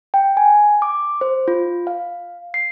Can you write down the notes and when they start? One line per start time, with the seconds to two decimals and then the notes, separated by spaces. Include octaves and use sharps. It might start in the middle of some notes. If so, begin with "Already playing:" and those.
0.14 G5
0.37 G#5
0.82 D6
1.21 C5
1.48 F4
1.87 F5
2.54 C7